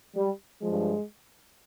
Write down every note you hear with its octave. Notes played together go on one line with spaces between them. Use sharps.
G3
G2 F3 G#3